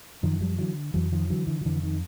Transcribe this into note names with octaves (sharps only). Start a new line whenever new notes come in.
F#2 D#3 F3
F3 G3
D3 E3 F#3
F2 E3 F#3
D#3 F3
D3 E3 F#3
D3 E3
F3
F2 D3 E3
D#3